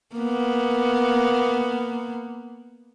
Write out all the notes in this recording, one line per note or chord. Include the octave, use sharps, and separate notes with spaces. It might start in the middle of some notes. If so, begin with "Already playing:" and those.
A#3 B3